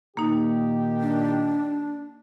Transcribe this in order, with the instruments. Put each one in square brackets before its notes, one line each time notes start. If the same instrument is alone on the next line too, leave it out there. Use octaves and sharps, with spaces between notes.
[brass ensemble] A#2 D#3 G4 [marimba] A#3 D#4
[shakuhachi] D4